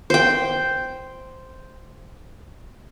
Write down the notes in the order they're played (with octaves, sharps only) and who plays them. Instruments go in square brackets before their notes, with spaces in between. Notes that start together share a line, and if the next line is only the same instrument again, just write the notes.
[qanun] C5 G5